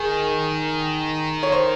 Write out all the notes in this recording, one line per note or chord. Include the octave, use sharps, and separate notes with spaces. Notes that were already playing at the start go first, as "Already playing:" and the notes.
Already playing: D#3 G#4
C#5
C5